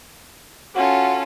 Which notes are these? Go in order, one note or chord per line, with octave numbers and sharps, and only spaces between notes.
C#4 F4 F#4 A4